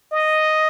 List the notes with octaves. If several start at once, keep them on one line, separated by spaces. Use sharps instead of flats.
D#5